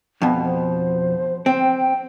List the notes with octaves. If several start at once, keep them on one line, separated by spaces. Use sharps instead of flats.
F2 B2
C5
C4 G5